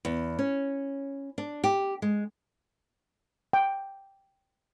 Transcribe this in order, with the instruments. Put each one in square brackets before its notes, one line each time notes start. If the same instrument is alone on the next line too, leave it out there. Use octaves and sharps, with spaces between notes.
[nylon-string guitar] E2
C#4
D4
G4
G#3
[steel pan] G5